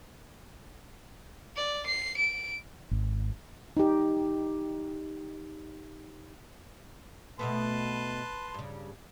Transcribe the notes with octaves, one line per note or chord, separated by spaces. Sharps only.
D5
C7
D7
G#1
D#4 G4
B2 A3 B3 B4 A5 C6
G2 C#3